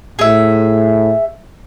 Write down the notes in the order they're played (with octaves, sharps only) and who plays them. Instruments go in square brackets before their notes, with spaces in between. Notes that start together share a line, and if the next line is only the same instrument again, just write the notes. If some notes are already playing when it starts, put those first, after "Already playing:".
[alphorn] A2 [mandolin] G#4 E5